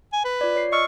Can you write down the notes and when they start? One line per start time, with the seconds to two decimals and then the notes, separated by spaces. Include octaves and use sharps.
0.13 G#5
0.24 B4
0.41 F4 D5
0.56 C#5 C7
0.72 D#5 C#6 E6 F6